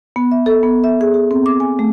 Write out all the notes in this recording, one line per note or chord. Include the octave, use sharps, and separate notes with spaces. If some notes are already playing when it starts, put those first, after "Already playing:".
B3
E5
A4
B3
E5
G#4
G#4
C4
D6
G#5
A3